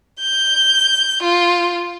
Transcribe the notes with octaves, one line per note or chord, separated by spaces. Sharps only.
G6
F4